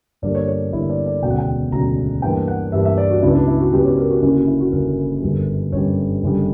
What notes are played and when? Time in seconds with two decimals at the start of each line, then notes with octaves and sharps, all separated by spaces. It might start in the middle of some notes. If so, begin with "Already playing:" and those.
0.22 G1 G2 D3 A#3 D5
0.35 C#5
0.48 C#5
0.72 G1 G2 D3 A#3 E4
0.90 D5
1.06 D5
1.22 E1 D2 C#3 F#3 G5
1.30 F#5
1.38 G5
1.72 E1 D2 C#3 F#3 A#5
2.22 G2 E3 A#3 D4 G5
2.48 F#5
2.72 G2 E3 A#3 D4 E5
2.85 E5
2.98 D5
3.10 F#4
3.22 C#2 C#3 F#3 B3 D4 E4
3.35 D4
3.48 E4
3.60 F#4
3.72 C#2 C#3 F#3 B3 D4 G4
3.85 C#5
3.98 A#4
4.10 F#4
4.22 F#1 F#2 D3 A#3 C#4 E4
4.35 F#4
4.47 E4
4.60 F#4
4.72 F#1 F#2 D3 A#3 C#4 A#4
5.22 G1 F#2 D3 G3
5.72 G1 F#2 D3 G3 C#5
6.23 F#1 F#2 D3 G3